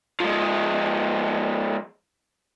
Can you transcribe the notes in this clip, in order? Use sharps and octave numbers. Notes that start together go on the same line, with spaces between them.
F3 G#3